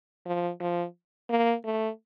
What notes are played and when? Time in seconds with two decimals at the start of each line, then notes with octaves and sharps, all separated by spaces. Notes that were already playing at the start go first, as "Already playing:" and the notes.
0.26 F3
0.60 F3
1.30 A#3
1.65 A3